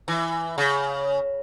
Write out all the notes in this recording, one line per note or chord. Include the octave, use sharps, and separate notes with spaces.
E3
C#3